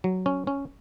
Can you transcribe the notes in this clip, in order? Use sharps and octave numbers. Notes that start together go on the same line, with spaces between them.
F#3
C#4
C#4